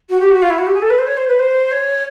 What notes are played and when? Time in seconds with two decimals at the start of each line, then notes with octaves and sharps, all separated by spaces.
0.09 F#4
0.19 G4
0.30 F#4
0.42 F4
0.50 E4
0.58 F#4
0.66 G4
0.73 G#4
0.81 A4
0.89 B4
0.98 C5
1.06 C#5
1.17 C5
1.27 B4
1.39 C5
1.71 C#5